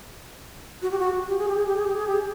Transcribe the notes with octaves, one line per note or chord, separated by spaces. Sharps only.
F#4
G4
F#4
G4
G#4
G4
G#4
G4
G#4
G4
G#4
G4